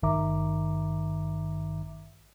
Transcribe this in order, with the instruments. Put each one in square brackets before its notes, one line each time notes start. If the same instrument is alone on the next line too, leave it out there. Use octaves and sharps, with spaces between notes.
[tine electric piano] G#1 G2 D#3 E5 A#5 D6